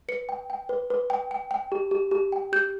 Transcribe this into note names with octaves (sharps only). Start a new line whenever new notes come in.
B4 C#7
G5
G5
B4
B4
G5
G5
G5
G4
G4
G4
G5
G4 G6